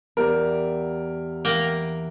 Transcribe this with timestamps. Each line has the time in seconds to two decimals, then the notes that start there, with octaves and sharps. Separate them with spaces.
0.17 E2 G4 A#4 D5
1.45 E3 A#3 A#4 G5 F#6